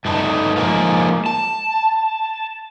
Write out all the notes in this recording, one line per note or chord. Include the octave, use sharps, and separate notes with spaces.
G2 A3 D#4 B4 A5
F3 G#3 A#3 D#4 F4
A5